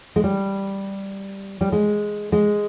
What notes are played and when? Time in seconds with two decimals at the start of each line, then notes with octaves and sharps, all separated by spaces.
0.16 G#3
0.24 G3
1.61 G3
1.72 G#3
2.32 G#3